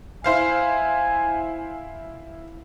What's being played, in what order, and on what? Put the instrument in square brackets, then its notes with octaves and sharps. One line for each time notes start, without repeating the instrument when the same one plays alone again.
[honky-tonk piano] E4 C5 F5 [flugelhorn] G#5